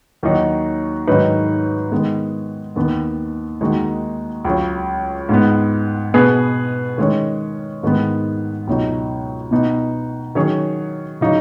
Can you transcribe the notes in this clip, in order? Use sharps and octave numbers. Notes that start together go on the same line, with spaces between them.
D#2 D#3 F#3 D#4 F#4
G#2 D#3 F#3 D#4 B4
D#3 G#3 B3
D#2 D#3 B3
D#2 D#3 G#3 D#4 F#4
C#2 C#3 F#3 C#4
G#2 G#3 B3
B2 B3 G#4 B4
D#3 G#3 C#4
G#2 D#3 G#3 B3
C#2 B2 F#3 D#4
B2 B3 D#4
D#3 F#3 C#4 G#4 C#5
C#3 F#3 D#4